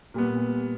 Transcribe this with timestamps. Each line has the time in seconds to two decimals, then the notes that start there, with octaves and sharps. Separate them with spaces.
0.14 A#2 G3 B3